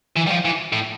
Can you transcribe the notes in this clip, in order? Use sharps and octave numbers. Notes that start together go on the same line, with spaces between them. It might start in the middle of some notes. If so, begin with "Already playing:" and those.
E3
G3
F3
E3
A2